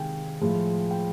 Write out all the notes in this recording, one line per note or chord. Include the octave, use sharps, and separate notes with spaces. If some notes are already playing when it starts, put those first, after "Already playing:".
Already playing: C3 D#3 G#3 F5 G5 G#5
A2 F3 G#3
G5